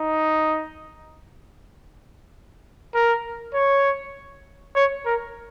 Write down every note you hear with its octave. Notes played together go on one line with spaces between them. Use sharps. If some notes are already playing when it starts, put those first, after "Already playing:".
Already playing: D#4
A#4
C#5
C#5
A#4